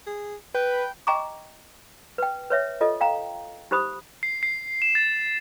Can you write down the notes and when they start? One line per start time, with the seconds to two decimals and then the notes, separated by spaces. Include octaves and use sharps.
0.07 G#4
0.54 B4 G5
1.07 D#5 G5 A#5 C#6 D6
2.18 B4 G5
2.50 B4 C#5 E5
2.81 F4 A4 D#5
3.01 F5 G5 A#5
3.71 D#4 G4 C5 B5 D#6
4.23 C7
4.43 C7
4.82 E7
4.95 A6